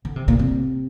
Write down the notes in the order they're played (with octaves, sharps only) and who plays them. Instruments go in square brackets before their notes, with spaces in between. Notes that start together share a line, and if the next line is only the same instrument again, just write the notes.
[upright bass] D3
C3
A#2
C3